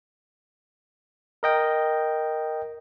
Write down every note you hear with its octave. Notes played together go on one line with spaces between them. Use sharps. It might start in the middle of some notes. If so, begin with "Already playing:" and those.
A#4 D#5 G5